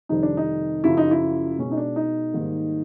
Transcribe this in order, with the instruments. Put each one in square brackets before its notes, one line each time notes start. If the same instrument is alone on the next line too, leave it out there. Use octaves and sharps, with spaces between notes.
[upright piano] F2 C3 D#3 G3 D#4
D4
D#4
F#2 C#3 F3 E4
D#4
E4
B2 G#3 C#4
D#4
D4
D#4
G#2 D#3 G3 A#3